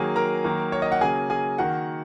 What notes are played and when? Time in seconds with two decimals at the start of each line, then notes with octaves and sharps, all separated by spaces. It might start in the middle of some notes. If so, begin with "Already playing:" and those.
Already playing: D#3 F#3 A#3 G#4 G#5
0.16 A#4 A#5
0.44 D#3 F#3 A#3
0.72 C#5
0.82 D#5
0.92 F#5
1.01 C#3 F#3 A#3 G#4 G#5
1.30 G#4 G#5
1.58 D#3 A#3 F#4 F#5